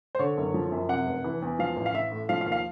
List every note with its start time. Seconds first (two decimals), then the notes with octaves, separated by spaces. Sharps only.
0.15 C5
0.19 D3 C#5
0.37 F#1
0.54 F3
0.72 F#2
0.89 C3 F#5
1.07 F1
1.24 E3
1.42 E2
1.59 F3 F5
1.76 A1
1.86 F5
1.94 A1 E5
2.12 A2
2.29 F3 F5
2.41 F5
2.46 D#2
2.52 F5